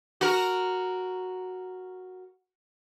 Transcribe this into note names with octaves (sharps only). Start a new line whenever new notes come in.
F#4 A#4